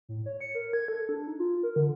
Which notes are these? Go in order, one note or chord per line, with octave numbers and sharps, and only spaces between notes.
A2
C#5
C#7
A#4
G#6
A4
D4
D#4
F4
A#4
D3